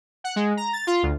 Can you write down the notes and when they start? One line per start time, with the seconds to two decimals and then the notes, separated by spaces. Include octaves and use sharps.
0.24 F#5
0.36 G#3
0.57 A#5
0.73 A6
0.87 F4
1.03 D2